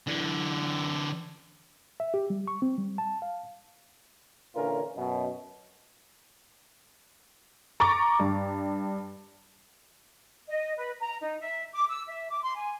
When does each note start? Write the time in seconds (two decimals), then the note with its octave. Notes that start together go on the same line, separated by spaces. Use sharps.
0.07 D3 E3
2.00 E5
2.14 G4
2.30 G3
2.48 C#6
2.62 C4
2.78 G3
2.98 A5
3.22 F5
4.56 A#2 D3 E3 C#4 F4 A#4
4.96 F#2 B2
7.80 A#5 C#6 D6 A6
8.20 G2
10.48 D#5
10.77 B4
11.00 A#5
11.21 D#4
11.41 E5
11.73 D6
11.89 E6
12.08 E5
12.29 D6
12.43 C6
12.55 G#5